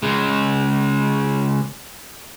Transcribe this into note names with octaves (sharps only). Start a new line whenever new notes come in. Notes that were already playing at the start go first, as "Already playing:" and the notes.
C#3 G#3